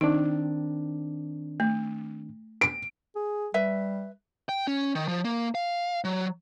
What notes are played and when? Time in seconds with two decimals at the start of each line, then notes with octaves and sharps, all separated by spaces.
0.01 D#3 C4 D4 D#4
1.60 A3
2.61 D7
3.16 G#4
3.54 G3 B4 E5
4.49 G5
4.67 C#4
4.95 D#3
5.08 F3
5.25 A#3
5.55 F5
6.04 F#3